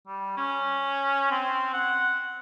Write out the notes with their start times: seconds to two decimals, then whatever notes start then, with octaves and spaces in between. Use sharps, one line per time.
0.07 G3
0.37 C#4
1.31 C4
1.73 F#5